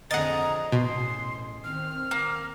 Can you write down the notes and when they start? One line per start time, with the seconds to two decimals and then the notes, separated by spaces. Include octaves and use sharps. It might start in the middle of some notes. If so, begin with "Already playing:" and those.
0.11 F2 D3 G#4 D#5 F#5 A#5 A6
0.72 A1 B2 C6
1.64 D#3 C4 F6
2.11 A#3